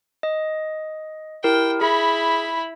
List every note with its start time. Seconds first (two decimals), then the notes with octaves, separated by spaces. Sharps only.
0.23 D#5
1.44 E4 G4 A#4 G5
1.81 E4 G#4 B5